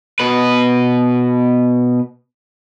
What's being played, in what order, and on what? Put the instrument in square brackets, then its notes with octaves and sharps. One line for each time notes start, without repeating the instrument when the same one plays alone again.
[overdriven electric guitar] B2 B4